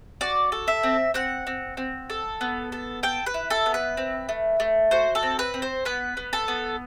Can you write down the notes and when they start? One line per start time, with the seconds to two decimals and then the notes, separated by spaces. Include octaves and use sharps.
0.21 F#4 D5
0.52 A4
0.68 E5
0.83 C4
1.14 C4 F#5
1.47 C4
1.77 C4
2.10 A4
2.41 B3
2.72 A4
3.03 A4 G5
3.26 B4
3.34 E4
3.50 A4
3.66 B3
3.74 B4
3.97 C4
4.29 A3
4.60 A3
4.91 F#4 C5
5.15 A4
5.23 C4
5.39 B4
5.54 C4
5.62 C5
5.85 B3 B4
6.17 B3
6.33 A4
6.48 B3